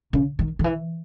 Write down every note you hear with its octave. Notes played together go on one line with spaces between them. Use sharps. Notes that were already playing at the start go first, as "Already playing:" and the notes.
C#3
D#3
D#3
E3